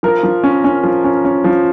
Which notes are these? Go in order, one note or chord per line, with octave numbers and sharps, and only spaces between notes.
F3 A#4
F3
C#4
C#4
F3
C#4
C#4
F3